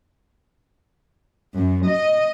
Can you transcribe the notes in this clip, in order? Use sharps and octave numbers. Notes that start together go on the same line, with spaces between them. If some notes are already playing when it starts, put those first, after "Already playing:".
F#2
D#5